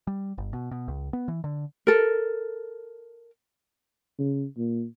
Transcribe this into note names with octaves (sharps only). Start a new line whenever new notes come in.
G3
G1
B2
B2
C#2
B3
E3
D3
A4 A#4
C#3
A#2